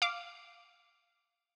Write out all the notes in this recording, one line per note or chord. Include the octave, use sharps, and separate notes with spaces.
F5 D6